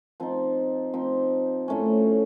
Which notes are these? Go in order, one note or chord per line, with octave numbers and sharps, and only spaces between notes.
F3 C4 D#4
F3 C4 D#4
A2 A3 C#4